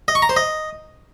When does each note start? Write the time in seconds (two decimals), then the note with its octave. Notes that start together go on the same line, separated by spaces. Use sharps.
0.08 D#5
0.15 C#6
0.22 A#5
0.29 C5
0.36 D#5